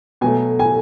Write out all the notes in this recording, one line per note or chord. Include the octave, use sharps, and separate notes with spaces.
B2 F#3 A3 G#5
G#5